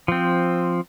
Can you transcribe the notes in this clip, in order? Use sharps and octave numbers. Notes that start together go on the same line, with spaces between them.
F3 C4